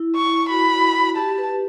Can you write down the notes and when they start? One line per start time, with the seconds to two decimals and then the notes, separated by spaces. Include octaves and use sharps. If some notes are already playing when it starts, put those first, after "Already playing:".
Already playing: E4
0.16 C#6
0.49 F#4 B5
1.16 G4 A5
1.38 B4